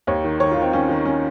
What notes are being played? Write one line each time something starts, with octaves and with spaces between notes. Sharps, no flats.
D#2 C#5
D#3
D#3 C#5
F4
D#3
C4
D#3 C#4
D#3
C#4